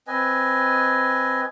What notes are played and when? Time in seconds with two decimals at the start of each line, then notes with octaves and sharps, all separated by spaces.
0.07 C4 B4 D#5 G#5